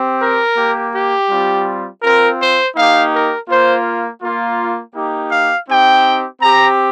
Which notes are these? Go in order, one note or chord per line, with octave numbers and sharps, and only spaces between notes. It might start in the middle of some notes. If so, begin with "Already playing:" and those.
Already playing: C4 G4
A#4
A#3 G4
G4
G3 C4 F4
C4 F4 A#4
C5
A#3 D#4 G4 F5
A#4
A#3 F4 C5
A#3 F4
A#3 D#4 G4
F5
C4 D#4 G4 G5
C4 G4 A#5